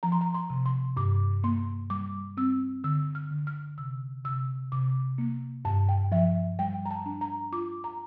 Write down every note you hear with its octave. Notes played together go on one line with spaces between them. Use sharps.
F3 A#5
C6
A#5
C6
C3
C6
G2 D6
A#3 C6
G3 D6
C4 E6
D3 E6
F6
D3
F6
C3 E6
C3 E6
C3 D6
A#3
G2 A5
G5
F3 E5
G3 G5
A#5
A5
D4
A#5
F4 D6
A#5